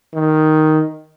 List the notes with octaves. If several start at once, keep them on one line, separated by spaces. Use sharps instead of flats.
D#3